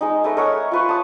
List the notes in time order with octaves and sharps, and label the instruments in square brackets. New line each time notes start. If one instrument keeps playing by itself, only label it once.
[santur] G#3 D#4
A3 B4 D#5
A#4 C#5 E5 F#5
F4 B4 C#6
A5 D#6